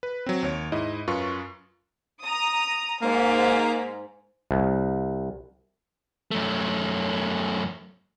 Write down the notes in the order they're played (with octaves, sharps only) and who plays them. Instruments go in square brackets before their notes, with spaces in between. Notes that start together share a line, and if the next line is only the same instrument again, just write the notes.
[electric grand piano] B4
F#3 C4
D#2 C#5 D7
G#2 E4 D#5
F#2 F4 B4 C#6
[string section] A#5 D#6
[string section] G#2 [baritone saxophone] A#3
[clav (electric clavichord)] C2
[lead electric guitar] F#2 A3